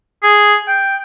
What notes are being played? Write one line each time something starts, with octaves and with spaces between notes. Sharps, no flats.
G#4
G5